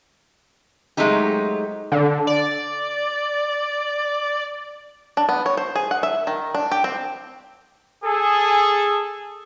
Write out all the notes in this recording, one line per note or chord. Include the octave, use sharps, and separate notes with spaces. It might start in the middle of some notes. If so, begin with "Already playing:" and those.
F#3 G#3 A3 C4 D#4 G4
D3
D5
D4
B3
C#5
C5
G#4
F#5
E5
D#3
D4
G4
C4
G#4 A4